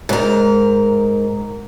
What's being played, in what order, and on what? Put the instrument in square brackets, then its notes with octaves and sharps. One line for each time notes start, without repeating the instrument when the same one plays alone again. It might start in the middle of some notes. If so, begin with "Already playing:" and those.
[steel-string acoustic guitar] G#2 A#4